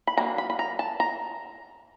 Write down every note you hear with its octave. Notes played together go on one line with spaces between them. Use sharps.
B5
F#3 A#3 D4 A#5
B5
B5
A#5
A5
A#5